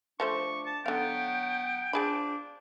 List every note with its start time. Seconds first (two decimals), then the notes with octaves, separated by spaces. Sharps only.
0.20 F3 A3 D4 C5 C#6
0.66 A5
0.86 D3 F#3 B3 F5 G5
1.93 F3 D4 G#4 B5